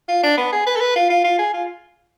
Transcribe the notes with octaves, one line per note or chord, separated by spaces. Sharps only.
F4
D4
B3
G#4
B4
A4
B4
F4
F4
F4
G#4
F4